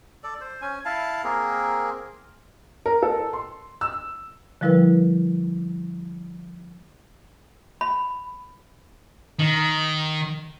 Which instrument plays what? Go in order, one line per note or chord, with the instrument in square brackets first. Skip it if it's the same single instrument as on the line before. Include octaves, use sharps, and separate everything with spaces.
[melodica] A4 D5
C5
C#4 G#5
E4 F5 A5
A#3 C4 G#4 A#4
[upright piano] A#4
A4
C6
E6
[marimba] D3 F3 G3 E4 A#4 B4
[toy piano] B5
[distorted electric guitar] D#3